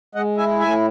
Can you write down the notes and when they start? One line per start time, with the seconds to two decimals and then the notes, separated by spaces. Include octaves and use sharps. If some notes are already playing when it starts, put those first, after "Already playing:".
0.15 G#3 D#5 F#5
0.38 E4 E5 G#5
0.60 A2 E5 G#5